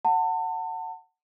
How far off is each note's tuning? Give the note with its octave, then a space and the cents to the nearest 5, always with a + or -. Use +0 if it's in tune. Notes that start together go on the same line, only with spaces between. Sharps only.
F#5 +0 A5 +35